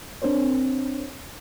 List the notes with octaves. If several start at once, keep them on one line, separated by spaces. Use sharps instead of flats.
C4 D4 A#4 C5 C#5